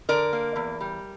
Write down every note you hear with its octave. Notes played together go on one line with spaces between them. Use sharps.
D3 A#4 D5
A#3
E2
G3